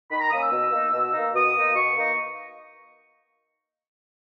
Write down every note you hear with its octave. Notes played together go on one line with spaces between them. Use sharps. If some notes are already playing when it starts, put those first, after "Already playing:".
D#3 B5
A#5
A#3 C#4 D#6
E6
B2
A#3 D#4
B2
A#3 D#4
B2 D#6
A#3 D#4
B2 C#6
A#3 D#4